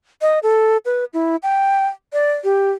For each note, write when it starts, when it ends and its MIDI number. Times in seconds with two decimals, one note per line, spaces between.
0.22 0.39 75
0.43 0.77 69
0.85 1.05 71
1.13 1.36 64
1.43 1.86 79
2.13 2.33 74
2.44 2.71 67